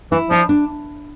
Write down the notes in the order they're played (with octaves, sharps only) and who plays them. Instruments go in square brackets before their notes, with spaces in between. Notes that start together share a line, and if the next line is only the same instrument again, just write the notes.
[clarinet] E3 [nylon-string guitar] E4
[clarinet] F3 [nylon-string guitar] D4
[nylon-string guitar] D4